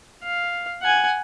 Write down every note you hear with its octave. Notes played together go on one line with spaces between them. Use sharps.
F5
F#5 G#5